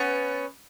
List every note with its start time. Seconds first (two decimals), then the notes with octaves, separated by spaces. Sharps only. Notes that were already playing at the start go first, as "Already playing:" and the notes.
Already playing: B3 C#4